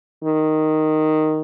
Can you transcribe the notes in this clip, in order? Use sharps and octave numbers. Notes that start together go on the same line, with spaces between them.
D#3